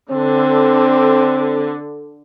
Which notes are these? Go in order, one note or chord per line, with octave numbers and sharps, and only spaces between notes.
D3 C4